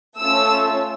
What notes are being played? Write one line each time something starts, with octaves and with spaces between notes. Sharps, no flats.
A3 C#4 F4 A4 E6